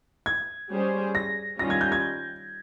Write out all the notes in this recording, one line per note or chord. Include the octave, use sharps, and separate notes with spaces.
G#6
G3 C#4 G#4 C5
A#6
D#3 G3 C#4 F4 A#6
G#6
G6
G#6